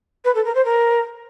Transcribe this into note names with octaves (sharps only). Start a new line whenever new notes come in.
B4
A4
A#4
C5
A#4